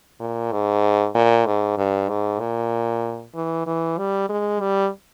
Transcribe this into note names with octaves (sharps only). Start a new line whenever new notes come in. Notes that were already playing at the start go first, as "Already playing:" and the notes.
A#2
G#2
A#2
G#2
G2
G#2
A#2
E3
E3
G3
G#3
G3